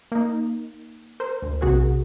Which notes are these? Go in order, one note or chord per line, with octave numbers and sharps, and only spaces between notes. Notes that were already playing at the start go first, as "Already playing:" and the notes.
A#3 D#4
A#4 C5
D2
B1 C3 F#4 G#4 A#4